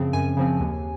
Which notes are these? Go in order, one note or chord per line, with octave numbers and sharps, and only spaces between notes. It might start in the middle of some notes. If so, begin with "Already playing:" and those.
Already playing: F#2 C#3 F3 C4
F#2 G#5
C#3 F3 C4
D#2